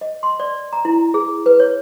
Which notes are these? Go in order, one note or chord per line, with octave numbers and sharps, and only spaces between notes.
D#5
C6
D5
A#5
E4
G#4
B4
C#5